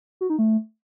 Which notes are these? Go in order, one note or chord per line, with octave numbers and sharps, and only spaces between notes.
F#4
D#4
A3